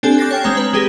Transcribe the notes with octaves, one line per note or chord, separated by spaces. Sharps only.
C4 D4 G4 A4 G#5 F#6
D6 F#6 G6 A6 A#6 C7
C#5 G5 F6
G#3 C4 C#5 A#5 A#6
B4
G#3 G4 G#4 A#6 B6 G7